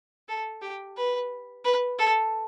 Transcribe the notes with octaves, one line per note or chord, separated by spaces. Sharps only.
A4
G4
B4
B4
A4